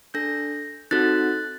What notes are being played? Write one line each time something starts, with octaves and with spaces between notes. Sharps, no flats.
D4 A4 G6 A#6
C4 D#4 F#4 A4 F#6 A6